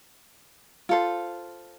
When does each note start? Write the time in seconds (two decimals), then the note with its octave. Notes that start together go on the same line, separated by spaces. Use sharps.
0.89 F4 A4 C5